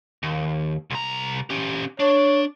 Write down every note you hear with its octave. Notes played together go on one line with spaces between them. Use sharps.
D#2
C2 A#5
C#4 G4
D4 C#5